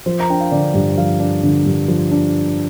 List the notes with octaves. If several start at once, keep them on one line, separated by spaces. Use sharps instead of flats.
F3 C5
A#5
D4 G5
F5
D3 D5
G2
F3 F5
D4
D3
G2
F3
D4